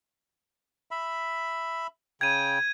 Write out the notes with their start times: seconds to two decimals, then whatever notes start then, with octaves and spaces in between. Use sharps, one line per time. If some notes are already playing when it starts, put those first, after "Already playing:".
0.91 E5 B5
2.21 C#3 G5 G#6 D#7